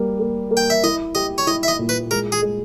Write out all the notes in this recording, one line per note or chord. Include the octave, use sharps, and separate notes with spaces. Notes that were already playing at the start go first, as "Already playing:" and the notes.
Already playing: G3 A#3
A#3
A#3
G5
E5
E4 D#5
G4 D#5
C#5
E4 D#5
E5
D#5
A#2
B4
G#3 A#4
G#4
G#3